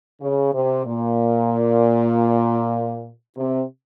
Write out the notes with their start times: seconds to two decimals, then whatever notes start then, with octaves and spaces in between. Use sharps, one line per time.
0.22 C#3
0.54 C3
0.85 A#2
3.37 C3